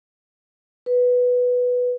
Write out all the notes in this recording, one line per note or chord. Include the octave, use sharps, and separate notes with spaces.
B4